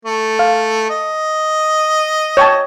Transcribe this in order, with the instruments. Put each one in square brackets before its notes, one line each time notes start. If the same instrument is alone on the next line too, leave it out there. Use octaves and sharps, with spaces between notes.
[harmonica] A3
[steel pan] F5
[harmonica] D#5
[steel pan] C#5 G5 A5